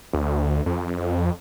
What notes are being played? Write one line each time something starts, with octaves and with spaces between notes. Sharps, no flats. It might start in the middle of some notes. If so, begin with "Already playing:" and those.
D2
F2